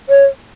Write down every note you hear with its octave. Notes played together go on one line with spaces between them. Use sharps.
C#5